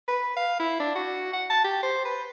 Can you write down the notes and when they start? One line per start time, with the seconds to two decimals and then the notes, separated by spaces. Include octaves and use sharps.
0.08 B4
0.36 F5
0.60 E4
0.80 D4
0.95 F#4
1.33 F#5
1.50 A5
1.64 G4
1.83 C5
2.05 B4